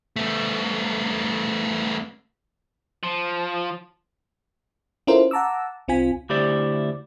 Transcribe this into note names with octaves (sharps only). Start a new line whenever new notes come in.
A3 B3
F3
C#4 E4 F4 A4 A#4 C5
F#5 A5 A#5 D6 E6
C2 C4 F4 G#5 B6
D2 E4 G4 C5 D5 E5